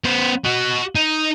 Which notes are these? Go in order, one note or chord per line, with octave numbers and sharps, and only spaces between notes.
B3 C5
F#4 D#5
D#4